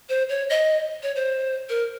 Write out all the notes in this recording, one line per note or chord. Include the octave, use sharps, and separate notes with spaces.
C5
C#5
D#5
C#5
C5
A#4